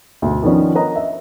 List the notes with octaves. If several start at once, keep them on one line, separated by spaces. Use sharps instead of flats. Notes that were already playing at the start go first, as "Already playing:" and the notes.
D2 B2
D#3 F3 B3 C#4 D4
A#4 B4 C#5 D#5 A#5
E5